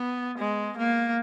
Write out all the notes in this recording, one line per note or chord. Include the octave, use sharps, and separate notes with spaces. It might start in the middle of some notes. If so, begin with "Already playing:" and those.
Already playing: B3
G#3
A#3